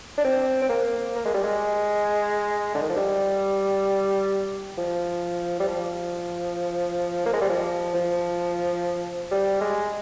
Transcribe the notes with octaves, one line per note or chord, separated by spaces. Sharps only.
D4
C4
C4
A#3
A#3
G#3
G3
G#3
D3
D#3
F3
G3
F3
G3
F3
A#3
G#3
G3
F3
F3
G3
G#3